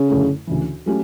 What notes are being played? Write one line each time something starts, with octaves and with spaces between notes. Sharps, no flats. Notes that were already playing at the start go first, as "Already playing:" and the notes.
Already playing: C#3
F#2 D3 A3 E4 A4
D2 C#3 E3
F#3 A3 C#4 G4